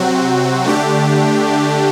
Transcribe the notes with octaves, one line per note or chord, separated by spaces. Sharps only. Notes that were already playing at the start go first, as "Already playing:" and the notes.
Already playing: C3 F#3 C4 F#4
D3 A3 D4 G4